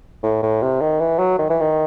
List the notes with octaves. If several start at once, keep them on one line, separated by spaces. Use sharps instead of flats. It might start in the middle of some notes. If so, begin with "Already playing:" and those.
A2
A2
C3
D#3
E3
F#3
D#3
E3
D#3